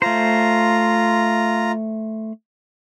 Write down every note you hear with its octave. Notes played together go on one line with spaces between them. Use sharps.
A3 F4 C5 A#5